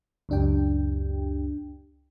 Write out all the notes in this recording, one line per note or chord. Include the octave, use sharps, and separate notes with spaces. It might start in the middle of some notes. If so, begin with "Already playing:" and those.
C#2 F#2 D4 G4 G5